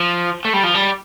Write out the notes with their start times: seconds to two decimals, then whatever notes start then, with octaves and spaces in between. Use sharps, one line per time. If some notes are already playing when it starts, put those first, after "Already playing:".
Already playing: F3
0.45 A3
0.53 G3
0.63 F3
0.74 G3